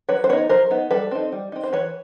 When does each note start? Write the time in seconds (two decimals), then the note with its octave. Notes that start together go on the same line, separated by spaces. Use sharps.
0.09 F#3 B4 C#5
0.24 C5
0.29 B3 B4 C#5
0.33 D#4
0.49 F#3 A#4 C5
0.71 B3 D#4
0.91 G3 A4 B4
1.11 C4 D#4
1.32 G3
1.52 C4 D#4
1.63 C5
1.73 E3 B4 C#5